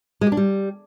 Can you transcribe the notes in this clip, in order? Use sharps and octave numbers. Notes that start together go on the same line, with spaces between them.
G#3
G4
D4
G3